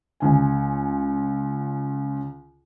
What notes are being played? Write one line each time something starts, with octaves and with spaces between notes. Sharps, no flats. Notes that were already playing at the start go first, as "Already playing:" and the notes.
C#2 G#5